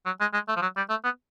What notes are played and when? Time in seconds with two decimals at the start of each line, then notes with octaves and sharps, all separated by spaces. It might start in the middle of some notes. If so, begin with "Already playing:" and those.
0.06 F#3
0.21 G#3
0.34 G#3
0.48 A3
0.56 F3
0.62 F#3
0.77 G3
0.90 A3
1.04 B3